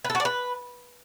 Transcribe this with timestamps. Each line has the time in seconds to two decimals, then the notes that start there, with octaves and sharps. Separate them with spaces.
0.05 B4
0.10 A4
0.15 F#4
0.20 D5
0.25 B4